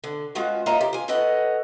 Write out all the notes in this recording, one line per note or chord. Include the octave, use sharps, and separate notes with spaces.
D3
G#3 B3 C#4 F4 F#4
A#3 F4 C#5 D#5 E5 A#5
G4
F4 G#5
A4 B4 C#5 D#5 F#5